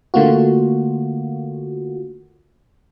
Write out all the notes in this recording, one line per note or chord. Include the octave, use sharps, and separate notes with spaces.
D3 A3 A#3 F4 F#4